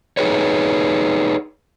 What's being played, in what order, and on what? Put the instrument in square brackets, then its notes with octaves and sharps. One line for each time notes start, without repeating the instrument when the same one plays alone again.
[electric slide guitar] D#4 E4 G#4 B4 C#5